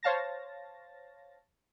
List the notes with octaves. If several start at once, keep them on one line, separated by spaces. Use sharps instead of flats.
C5 C#5 F5 A5 A6 A#6